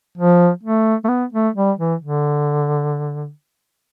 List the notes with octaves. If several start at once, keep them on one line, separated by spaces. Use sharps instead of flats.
F3
A3
A3
B3
A3
G3
E3
D3